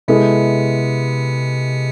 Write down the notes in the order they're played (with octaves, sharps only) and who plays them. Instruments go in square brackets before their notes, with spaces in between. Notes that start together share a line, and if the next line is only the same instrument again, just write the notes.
[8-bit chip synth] C3 [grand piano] G#3 B3 E4 A4